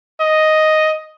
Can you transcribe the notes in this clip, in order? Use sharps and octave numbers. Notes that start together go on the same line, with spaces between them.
D#5